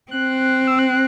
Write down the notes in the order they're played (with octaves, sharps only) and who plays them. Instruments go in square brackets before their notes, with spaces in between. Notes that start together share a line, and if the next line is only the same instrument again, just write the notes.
[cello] C4 [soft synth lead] F#6
[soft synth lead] E6
F#6